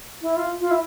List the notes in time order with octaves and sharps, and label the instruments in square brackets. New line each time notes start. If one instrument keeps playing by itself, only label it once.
[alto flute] E4
F4
F4
E4